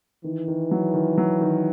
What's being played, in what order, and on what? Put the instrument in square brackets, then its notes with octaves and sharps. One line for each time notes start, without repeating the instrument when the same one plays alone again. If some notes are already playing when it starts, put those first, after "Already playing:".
[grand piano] D#3 [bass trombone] E3
[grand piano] D#3
F#3
D#3
F#3
D#3